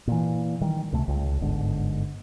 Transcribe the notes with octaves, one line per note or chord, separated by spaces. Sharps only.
A#2 E3
D#3 G3
C#2 C3 A3
C#2
G1 G#2 D3